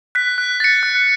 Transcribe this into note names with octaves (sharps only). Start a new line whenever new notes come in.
F#6 B6
F#6
A6 C#7
F#6